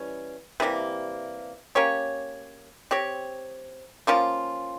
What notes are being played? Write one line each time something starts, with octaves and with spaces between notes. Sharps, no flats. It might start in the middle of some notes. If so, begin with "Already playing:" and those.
Already playing: E3 G3 C#4
C3 E3 G3 A#3
A#3 C#4 G4 C#5
C4 G4 C#5
F3 A#3 C#4 F4